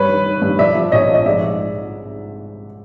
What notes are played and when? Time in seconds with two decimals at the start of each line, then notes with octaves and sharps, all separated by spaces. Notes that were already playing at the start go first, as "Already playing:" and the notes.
Already playing: G2 B4 C#5
0.09 D#3
0.26 D#3
0.42 G2
0.59 F3 D5 E5
0.75 F3
0.92 A#1 C#5 D#5
1.08 F3
1.14 D#5
1.26 G#2 D5 E5
1.43 G#2